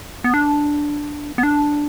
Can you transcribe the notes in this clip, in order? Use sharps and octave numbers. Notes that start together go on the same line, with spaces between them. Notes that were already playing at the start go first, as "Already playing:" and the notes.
B3
D4
B3
D4